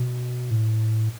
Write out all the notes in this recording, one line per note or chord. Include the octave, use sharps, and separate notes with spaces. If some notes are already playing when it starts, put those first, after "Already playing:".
Already playing: B2
A2